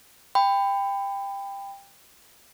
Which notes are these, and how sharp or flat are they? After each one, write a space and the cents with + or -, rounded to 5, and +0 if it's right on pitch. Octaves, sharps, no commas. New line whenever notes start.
G5 +15 B5 +25